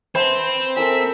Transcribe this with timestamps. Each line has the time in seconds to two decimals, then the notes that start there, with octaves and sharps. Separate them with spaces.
0.15 C4 B4 C5 E5 A5
0.76 A4 A#4 E5 G#5